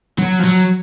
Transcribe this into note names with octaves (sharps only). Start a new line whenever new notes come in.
F#3
F3
F#3